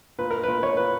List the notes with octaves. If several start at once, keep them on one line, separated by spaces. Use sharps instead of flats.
A#2 B4
A#4
A#2 B4
C#5
A#2 B4